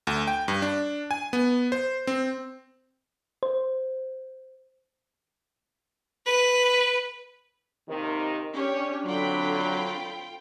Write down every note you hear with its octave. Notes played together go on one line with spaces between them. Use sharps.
D2
G5
G2
D4
G#5
B3
C5
C4
C5
B4
D#2 C3 D#3
C#4 D4 G4 C#5
D3 F#3 C4 F4 G5 B5